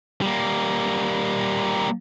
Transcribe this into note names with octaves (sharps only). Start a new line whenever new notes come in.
G3 A#3